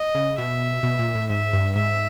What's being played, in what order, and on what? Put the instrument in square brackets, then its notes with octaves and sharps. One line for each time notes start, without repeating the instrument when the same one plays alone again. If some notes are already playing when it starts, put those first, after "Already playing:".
Already playing: [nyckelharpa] D#5
[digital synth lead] C#3
[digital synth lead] B2 [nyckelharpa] E5
[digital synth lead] B2
A#2
A2
[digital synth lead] G#2 [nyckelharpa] E5
[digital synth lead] G2
[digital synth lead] G#2 [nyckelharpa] E5